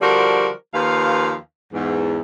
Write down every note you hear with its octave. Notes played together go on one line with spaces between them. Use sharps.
D3 F3 G3 F#4 A#4 C5
D#2 F3 B4 F5
E2 G#2